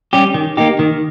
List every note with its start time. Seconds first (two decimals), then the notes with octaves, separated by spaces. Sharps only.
0.13 G3 C#4 G4
0.34 D#3
0.57 A#3 D#4 G4
0.79 D#3